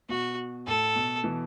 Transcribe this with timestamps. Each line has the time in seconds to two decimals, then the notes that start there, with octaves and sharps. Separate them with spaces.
0.09 B2 F#4
0.66 A2 A4
0.96 B2
1.24 B2 E3